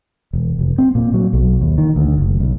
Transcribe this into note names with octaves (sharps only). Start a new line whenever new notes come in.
E1
F1
C4
A#2
F#3
B1
D#2
D#3
D2
F#1
B1